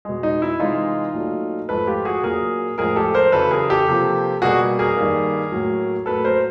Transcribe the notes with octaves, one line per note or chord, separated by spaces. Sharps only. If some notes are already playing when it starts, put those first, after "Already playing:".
B2 G#3
D#4
E4
C3 E3 G#3 D#4 F4
A#2 F#3 A3
G#2 F3 A3 A4 B4
F4 G4
F#4 G#4
A#2 F#3 A#3 G#4 A#4
A2 F3 G#3 G#4 A#4
G4 A4
A#4 C5
F#2 C#3 E3 A4 B4
G#4 A#4
G4 A4
C3 F3 A#3
B2 G3 A#3 F#4 G#4
G#4 A#4
G2 D#3 G3 A#3
A2 F#3 A#3
A2 F#3 A#3 A4 B4
A#4 C5